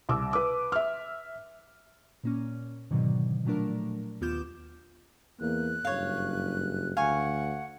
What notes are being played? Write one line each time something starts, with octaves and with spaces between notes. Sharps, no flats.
C2 D6 E6
B4 D6
E5 F6
A#2 A#3 C#4
G#2 B2 D3 D#3 F#3
A#2 F3 F#3 A3 D4 A#4
D#2 B3 F4 D6 G6 E7
E2 A#3 F#6
F#1 G2 C#5 F5
D2 F5 F#5 G#5 C#6